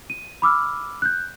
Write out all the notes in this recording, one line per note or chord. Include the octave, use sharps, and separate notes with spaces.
D#7
B5 D6 E6 F6
F#6 G6